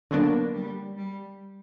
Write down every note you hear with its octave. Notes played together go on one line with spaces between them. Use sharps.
D3 F#3 A#3 B3 D4
G3
G3